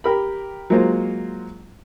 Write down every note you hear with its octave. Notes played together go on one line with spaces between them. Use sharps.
G4 A#4 B5
F#3 G#3 A#3 F4 C5